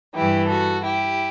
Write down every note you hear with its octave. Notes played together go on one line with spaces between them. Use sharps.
G2 E3 E4 G4
F#4 A4
E4 G4